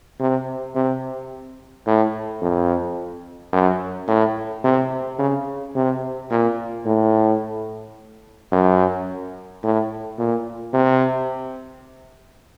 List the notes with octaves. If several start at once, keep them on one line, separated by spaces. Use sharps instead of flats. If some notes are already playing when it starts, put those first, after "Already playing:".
C3
C3
A2
F2
F#2
A2
C3
C#3
C3
A#2
A2
F#2
A2
A#2
C3